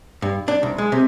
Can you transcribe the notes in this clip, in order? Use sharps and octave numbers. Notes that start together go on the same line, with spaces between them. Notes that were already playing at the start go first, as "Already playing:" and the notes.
G2
D4
C2
G#3
C3